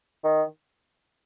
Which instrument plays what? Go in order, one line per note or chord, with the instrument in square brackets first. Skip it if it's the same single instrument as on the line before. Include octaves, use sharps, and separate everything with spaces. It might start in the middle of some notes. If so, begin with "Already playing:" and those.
[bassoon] D#3